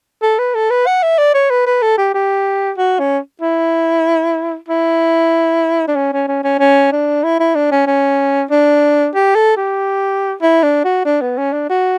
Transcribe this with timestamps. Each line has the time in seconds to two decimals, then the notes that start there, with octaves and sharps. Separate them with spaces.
0.22 A4
0.39 B4
0.55 A4
0.70 B4
0.87 F#5
1.03 E5
1.18 D5
1.34 C#5
1.50 B4
1.66 B4
1.82 A4
1.98 G4
2.14 G4
2.77 F#4
2.99 C#4
3.41 E4
4.69 E4
5.87 D4
5.96 C#4
6.12 C#4
6.28 C#4
6.44 C#4
6.59 C#4
6.92 D4
7.24 E4
7.40 E4
7.55 D4
7.71 C#4
7.87 C#4
8.51 D4
9.15 G4
9.35 A4
9.57 G4
10.42 E4
10.63 D4
10.84 F#4
11.05 D4
11.21 B3
11.37 C#4
11.53 D4
11.69 F#4